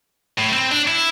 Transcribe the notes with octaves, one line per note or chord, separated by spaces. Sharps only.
A2
C4
D4
E4